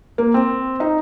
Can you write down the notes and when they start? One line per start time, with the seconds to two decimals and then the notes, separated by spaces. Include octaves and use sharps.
0.18 A#3
0.34 C4
0.80 D#4